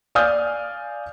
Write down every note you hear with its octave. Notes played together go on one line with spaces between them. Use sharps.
D5 F5 G#5 D#6 F6 G6